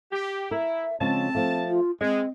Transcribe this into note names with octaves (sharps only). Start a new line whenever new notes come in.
G4
E4 A#4 E5
C#3 F3 G#3 C4 A5
F3 A3
F4
G#3 C4 D#5